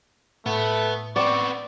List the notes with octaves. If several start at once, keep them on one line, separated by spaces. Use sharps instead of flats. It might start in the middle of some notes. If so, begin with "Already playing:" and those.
A2 A3 B3
B3 C4 D5 C#6